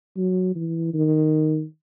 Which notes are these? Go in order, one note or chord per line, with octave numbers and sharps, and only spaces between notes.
F#3
E3
D#3